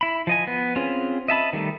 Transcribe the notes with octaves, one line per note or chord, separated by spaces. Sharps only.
E4 B5
F3 D#5 G#5
B3
C4 C#4 F4 G#4
D#5 E5 A5 B5
D#3 G3 A3